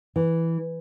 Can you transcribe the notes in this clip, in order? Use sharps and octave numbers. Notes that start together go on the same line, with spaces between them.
E3